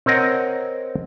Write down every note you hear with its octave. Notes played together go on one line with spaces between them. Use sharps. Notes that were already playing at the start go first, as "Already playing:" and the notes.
C4 A#4 C#5 D#5 F#5